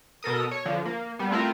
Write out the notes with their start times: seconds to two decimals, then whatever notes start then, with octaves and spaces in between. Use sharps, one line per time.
0.23 B2 A4 A#4 D#6
0.51 C#5
0.66 D3 F3
0.85 A#3
1.19 G3 B3
1.31 A3 C4 E4 F4 A#4